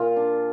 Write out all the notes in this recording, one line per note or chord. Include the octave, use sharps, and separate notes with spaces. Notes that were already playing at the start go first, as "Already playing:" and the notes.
Already playing: A#2 F4
D4